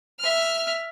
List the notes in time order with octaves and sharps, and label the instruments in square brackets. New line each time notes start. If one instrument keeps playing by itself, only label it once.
[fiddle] E5 F6